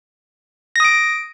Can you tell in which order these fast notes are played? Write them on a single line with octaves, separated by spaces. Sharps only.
A#6 D#6 D7